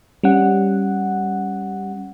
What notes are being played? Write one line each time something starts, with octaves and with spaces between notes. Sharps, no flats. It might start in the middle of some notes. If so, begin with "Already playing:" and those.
G3 C#4 F#5